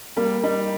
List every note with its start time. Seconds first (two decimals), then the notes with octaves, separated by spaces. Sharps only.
0.16 G3 A#3
0.43 G3 D#4